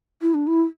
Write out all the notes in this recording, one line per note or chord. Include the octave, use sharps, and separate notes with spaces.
E4
D4
E4